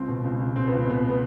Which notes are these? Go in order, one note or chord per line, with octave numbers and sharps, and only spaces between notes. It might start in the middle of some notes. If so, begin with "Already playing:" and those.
Already playing: C#2 C4
B2
C#2
C#2
B2 C4
C#2 B3
B2 B3
B3